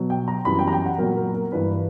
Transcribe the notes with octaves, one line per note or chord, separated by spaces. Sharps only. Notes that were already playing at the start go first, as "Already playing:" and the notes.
Already playing: B2 F#3
G5
A#5
F#2 E3 G3 B5
G5
A#5
G5
F#5
A#2 F#3 A#4
A#4
A#4
G2 E3 G3 B4